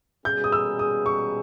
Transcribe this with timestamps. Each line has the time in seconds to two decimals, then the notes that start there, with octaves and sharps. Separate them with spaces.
0.25 B2 G3 C#4 G#4 G6
0.44 D#6
0.52 E6
0.79 D#6
1.06 C#6